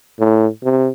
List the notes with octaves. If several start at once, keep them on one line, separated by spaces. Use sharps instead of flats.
A2
C3